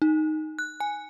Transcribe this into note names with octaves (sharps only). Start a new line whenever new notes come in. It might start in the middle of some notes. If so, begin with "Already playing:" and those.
D#4
F#6
G#5